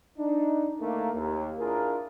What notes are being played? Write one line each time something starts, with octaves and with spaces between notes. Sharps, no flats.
D4 D#4
A2 D3 D#3 A3 A#3
D#2
D4 E4 F4 G#4 A#4